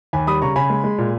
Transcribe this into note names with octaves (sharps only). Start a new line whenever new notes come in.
D#2 G#5 B5
G3 B5 D#6
C#3 A#5 C#6
C#3 G#5 B5
G#3
G#3
A#2